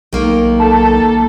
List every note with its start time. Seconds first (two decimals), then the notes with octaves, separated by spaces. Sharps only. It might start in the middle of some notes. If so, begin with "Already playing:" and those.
0.13 B1 D#3 A#3
0.60 A4 A5